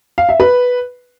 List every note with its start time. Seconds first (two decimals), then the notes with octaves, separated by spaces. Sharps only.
0.18 F5
0.29 E5
0.40 B4